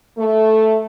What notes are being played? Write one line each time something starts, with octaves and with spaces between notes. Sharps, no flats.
A3